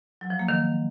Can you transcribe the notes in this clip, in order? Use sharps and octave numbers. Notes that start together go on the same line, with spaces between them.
F#3
F3
A#3
D#3